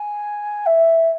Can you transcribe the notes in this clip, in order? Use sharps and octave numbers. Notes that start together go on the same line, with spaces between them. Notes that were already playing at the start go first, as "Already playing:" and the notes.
Already playing: G#5
E5